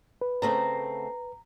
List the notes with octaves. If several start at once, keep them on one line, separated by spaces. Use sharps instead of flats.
B4
C#3 A3 C4 A#5